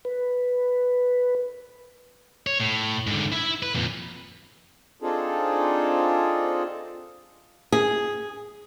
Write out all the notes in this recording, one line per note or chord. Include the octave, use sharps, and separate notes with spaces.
B4
C#5
A2
G#2 D3
E4 E5
B4
F2 A#2
C4 D4 D#4 F4 G#4 A4
G#4